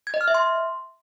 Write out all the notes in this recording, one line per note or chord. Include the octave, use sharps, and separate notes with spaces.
G#6
D#5
F6
E5
C6